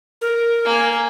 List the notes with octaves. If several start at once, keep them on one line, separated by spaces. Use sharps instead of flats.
A#4
A#3 G#5